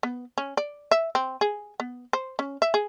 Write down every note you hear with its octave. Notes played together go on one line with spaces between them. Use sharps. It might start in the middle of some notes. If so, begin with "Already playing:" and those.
B3
C#4
D5
E5
C4
G#4
B3
C5
C#4
E5
G#4